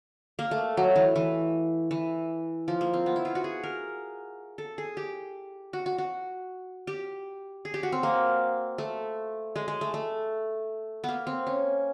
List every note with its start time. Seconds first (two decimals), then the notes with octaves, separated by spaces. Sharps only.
0.39 A#3
0.51 A3
0.77 F#3
0.96 E3
1.16 E3
1.91 E3
2.68 F3
2.81 A#3
2.94 C4
3.06 B3
3.16 E4
3.25 F4
3.35 F#4
3.44 G#4
3.63 A#4
4.58 A4
4.78 G#4
4.97 G4
5.73 F#4
5.86 F#4
5.98 F#4
6.87 G4
7.65 G#4
7.74 G4
7.83 F#4
7.92 C4
8.03 A#3
8.78 A3
9.56 G#3
9.68 G#3
9.81 A3
9.94 A3
11.04 A#3 B3
11.27 C4
11.47 C#4